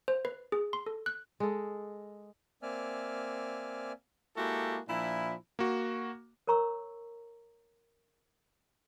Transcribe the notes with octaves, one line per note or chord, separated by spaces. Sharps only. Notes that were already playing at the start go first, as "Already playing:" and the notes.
C5
B4
G#4
C6
A4
F#6
G#3 A4
A#3 C4 D5 E5 G#5 F6
G#3 A#3 E4 F#4 G4 A4
A#2 F3 D4 E4
A#3 F#4
A#4 C#5 A#5 C#6 E6